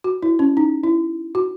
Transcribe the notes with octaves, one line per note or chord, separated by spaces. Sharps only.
F#4
E4
C#4
D#4
E4
F#4